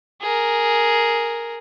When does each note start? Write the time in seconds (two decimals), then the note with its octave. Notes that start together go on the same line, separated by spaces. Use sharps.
0.21 G#4 A#4